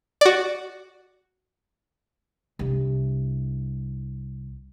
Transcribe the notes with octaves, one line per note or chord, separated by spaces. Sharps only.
F#4 D5
C2 D4